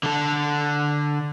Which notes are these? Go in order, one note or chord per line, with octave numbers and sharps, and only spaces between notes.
D3 A4